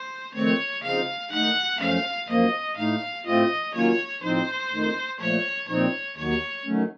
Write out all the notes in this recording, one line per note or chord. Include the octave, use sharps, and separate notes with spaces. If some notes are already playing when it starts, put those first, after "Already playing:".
Already playing: C5
F2 D#3 A3 C4 C#5
C#3 F3 C4 D#4 F5
D#3 A3 D#4 F#5
F#2 F3 A3 C#4 F5
F#2 F3 A#3 D#5
A2 A3 D#4 F5
A2 A3 C4 F4 D#5
D#3 F#3 A#3 C#4 F4 C#5
A2 F3 C4 D#4 C5
F2 D#3 A3 D#4
A#2 F3 A3 C#5
A#2 F3 C4 D#4 C#5
D#2 D#3 F#3 C#5
F#2 D#3 F#3 A3 C#4